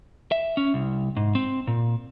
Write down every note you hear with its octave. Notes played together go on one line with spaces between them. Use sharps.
E5
C#4
C2
G#2
C4
A#2